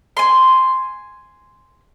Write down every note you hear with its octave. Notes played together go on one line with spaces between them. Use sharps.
G#5 C6